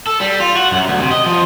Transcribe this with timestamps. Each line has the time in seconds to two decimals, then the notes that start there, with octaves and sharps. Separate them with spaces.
0.07 A4
0.21 G3
0.40 F4
0.56 F#4
0.72 F#2
0.88 D2
1.00 C3
1.12 D#5
1.26 F3